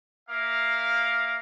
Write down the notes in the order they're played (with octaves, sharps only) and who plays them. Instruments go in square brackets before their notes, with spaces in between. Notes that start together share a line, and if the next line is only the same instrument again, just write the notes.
[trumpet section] A#3 E5 F5